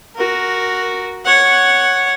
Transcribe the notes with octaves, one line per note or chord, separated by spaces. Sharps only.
F#4 A#4
C#5 F#5